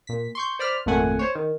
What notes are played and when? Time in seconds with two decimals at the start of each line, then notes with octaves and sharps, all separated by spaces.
0.07 A#2 B6
0.35 C6 C#6 G6
0.59 C5 D5 B5 F6
0.86 G#1 F2 A#2 A3 F#5 G#5
1.19 C5 C#5
1.35 D#3